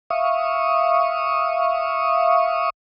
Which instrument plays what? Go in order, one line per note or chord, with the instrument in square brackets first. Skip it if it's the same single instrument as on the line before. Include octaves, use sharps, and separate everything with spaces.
[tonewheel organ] E5 F5 C#6 D#6